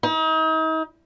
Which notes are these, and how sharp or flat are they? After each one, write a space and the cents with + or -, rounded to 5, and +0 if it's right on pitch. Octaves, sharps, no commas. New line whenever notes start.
D#4 +40